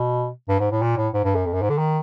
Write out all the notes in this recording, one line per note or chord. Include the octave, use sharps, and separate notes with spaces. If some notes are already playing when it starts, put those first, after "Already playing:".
Already playing: B2
G2
G#2
A2
A#2
A2
G#2
G2
F#2
F2
F#2
G#2
D3
D#3